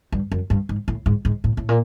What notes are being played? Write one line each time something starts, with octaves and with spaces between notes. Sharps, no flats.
G2
F#2
G2
G#2
A2
G#2
G#2
A2
A2
A#2